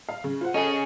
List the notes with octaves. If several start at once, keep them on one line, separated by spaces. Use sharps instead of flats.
F5
C#3
F4 C5 F#5
C#4 G#4 A4 D#5